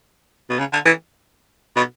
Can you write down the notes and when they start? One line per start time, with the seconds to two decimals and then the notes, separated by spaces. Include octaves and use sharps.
0.50 B2
0.59 C#3
0.73 D3
0.86 E3
1.76 B2